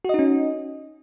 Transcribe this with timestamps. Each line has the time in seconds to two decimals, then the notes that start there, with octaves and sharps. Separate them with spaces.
0.05 F#4
0.09 D#5
0.14 D#4
0.19 C#4